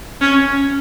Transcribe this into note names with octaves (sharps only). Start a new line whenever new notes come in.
C#4